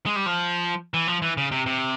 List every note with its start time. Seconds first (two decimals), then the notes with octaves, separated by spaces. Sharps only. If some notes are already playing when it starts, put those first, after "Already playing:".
0.06 G#3
0.16 G3
0.26 F3
0.94 E3
1.07 F3
1.22 E3
1.37 C#3
1.52 C3
1.66 C3